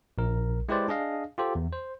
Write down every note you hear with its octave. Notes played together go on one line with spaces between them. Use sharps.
A#1 A#4
G#3 E4 G4 B4 C5 D5
D4 G#4 D#5 F5
F4 G4 A4 C5
E2
C5